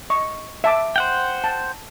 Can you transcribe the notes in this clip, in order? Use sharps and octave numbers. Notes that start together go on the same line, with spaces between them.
D#5 C#6
E5 A5 D6
C5 F#5 G5
A5